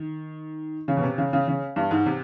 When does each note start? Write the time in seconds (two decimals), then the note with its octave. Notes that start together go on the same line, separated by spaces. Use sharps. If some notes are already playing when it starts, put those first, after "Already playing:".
Already playing: D#3
0.88 C#3
0.97 B2
1.03 C3
1.18 C#3
1.33 C#3
1.48 C#3
1.76 G2
1.91 G#2
2.06 C3